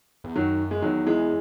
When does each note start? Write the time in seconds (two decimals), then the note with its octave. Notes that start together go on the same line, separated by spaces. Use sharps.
0.24 E2
0.36 F#2 D#3 F#3
0.71 G#3
0.82 E2 D#3 F#3
1.06 E3 G#3